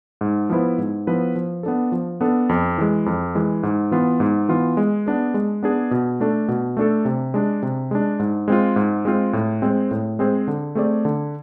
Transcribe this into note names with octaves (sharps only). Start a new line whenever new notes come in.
G#2
F3 B3 E4 B4
G#2
F3 B3 E4 B4
F3
B3 D4 A4
F3
B3 D4 A4
F2
E3 G#3
F2
E3 G#3
G#2
E3 B3 F4
G#2
E3 B3 F4
G#3
B3 D4 G#4
G#3
B3 D4 G#4
B2
A3 D4 A4
B2
A3 D4 A4
C3
G#3 D4
C3
G#3 D4
G#2
G#3 C4 F4
G#2
G#3 C4 F4
A2
G#3 C4 G#4 C5
A2
G#3 C4 G#4 C5
D3
A3 C4 G#4 D5
D3